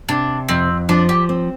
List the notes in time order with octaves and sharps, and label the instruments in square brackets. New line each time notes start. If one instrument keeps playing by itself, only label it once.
[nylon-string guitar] C3 [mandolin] D4
[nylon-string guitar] F2 [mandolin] C4
[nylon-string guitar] F3 [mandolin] D4
[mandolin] G4
[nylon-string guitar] C4